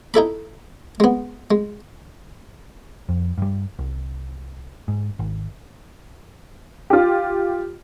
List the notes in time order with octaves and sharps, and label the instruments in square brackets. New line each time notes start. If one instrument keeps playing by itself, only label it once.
[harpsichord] D#4 E4 A4 B5
G#3 B3
G#3
[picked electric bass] F2
G2 G3
C2
G#2
G#1
[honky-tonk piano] F4 G4